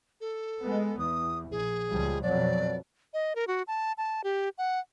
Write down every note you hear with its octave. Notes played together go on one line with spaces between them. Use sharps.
A4
G#3 B3
E2 D#6
A#1 G#4
C#2 F3 G3
F2 B2 F#3 D5
D#5
A#4
F#4
A5
A5
G4
F#5